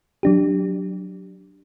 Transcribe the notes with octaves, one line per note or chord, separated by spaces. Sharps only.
F#3 D4 G4